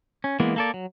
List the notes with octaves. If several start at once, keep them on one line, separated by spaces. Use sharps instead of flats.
C#4
E3 G#3 A#3 B3
A#3 A4 D5
F#3